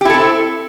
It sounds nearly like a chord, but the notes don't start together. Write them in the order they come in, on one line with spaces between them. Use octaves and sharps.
G4 E4 A4 C4